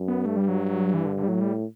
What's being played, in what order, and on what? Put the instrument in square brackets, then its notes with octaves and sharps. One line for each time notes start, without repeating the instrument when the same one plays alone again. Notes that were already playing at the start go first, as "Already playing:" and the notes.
Already playing: [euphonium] F#2
[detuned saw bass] B3
[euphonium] G2 [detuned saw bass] A3
[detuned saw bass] G3
F#3
E3
D3
D3
G3
[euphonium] A2 [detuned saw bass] F#3
[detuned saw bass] G3